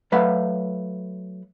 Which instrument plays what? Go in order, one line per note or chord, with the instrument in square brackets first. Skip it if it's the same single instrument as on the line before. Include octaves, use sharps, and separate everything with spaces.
[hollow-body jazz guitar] F#3 A3 B4 F5 F#5